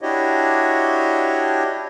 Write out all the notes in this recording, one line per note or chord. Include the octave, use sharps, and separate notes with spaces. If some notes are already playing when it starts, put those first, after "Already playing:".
D4 E4 F#4 G4 C#5 D#5